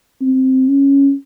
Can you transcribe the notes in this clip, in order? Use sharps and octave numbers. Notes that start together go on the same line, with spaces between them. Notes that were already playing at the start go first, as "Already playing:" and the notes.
C4
C#4